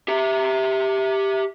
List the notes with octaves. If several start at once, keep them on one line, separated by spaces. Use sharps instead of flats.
G4 E5